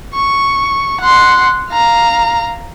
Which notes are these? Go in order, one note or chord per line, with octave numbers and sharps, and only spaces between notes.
C#6
F#5 C6
F5 A#5